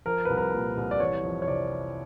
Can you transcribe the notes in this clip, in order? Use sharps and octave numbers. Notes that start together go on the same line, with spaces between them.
F3 A#4
C2 B4
A#4
A#2
C2
D5
E3 C#5
F2
C#5
C3 D5